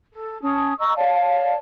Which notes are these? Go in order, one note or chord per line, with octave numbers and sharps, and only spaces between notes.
A4
C#4 A5 D#6
D#5 A#5 C#6 E6
C#5 D5 F5 A5